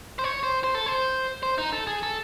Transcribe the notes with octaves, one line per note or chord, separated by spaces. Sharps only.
C5
C#5
C5
C5
A4
C5
C5
D#4
A4
G#4
A4